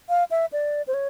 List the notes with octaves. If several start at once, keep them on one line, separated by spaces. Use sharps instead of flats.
F5
E5
D5
C5
C#5